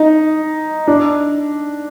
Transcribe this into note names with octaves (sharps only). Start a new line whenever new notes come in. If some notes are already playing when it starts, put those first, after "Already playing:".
Already playing: D#4
D4